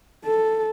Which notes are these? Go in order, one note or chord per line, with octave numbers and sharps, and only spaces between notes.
A4